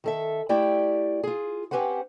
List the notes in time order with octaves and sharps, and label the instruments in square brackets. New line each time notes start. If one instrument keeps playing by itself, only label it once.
[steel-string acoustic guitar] D#3 A4 E5
A3 E4 G4 D5 G5
F4 G#4
C4 C#4 G4 B4 C5 F#5